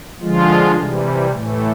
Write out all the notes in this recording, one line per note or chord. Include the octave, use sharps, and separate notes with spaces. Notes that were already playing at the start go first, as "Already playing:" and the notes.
D3 F3 G#3 F4
C3 E3 G3
A2 E3 A3